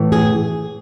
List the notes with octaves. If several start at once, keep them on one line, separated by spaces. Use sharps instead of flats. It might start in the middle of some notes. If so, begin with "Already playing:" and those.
Already playing: A2 E3
G#4